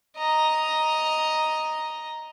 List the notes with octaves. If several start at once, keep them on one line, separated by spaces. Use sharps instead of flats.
D#5 A#5